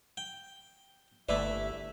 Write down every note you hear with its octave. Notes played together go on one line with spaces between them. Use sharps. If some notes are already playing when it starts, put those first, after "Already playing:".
G5
G1 A3 E4 B4 D5 E5